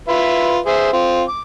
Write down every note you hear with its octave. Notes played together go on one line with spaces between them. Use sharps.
F4 B4 E5
G#4 C5 E5
C4 F4
D6